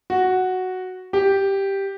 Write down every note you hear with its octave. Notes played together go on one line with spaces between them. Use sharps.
F#4
G4